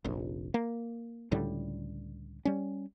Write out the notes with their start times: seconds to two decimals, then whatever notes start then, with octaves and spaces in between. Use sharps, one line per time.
0.04 F1 A#1
0.54 A#3
1.32 C#2 A2 D3 G3
2.45 G3 C#4